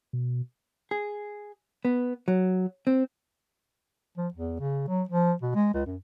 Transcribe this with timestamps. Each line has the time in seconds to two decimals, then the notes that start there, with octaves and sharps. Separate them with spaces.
0.13 B2
0.91 G#4
1.85 B3
2.28 F#3
2.87 C4
4.17 F3
4.34 E2
4.60 C#3
4.88 F#3
5.09 F3
5.42 B2
5.55 G#3
5.74 C#2
5.86 F#2